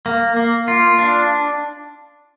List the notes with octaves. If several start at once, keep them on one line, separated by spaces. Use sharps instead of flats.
A#3
A#3
F4
D4